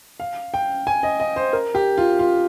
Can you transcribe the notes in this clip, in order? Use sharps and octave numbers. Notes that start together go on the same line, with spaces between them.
F5
G5
G#5
D#5
D#5
C5
A#4
G4
F4
F4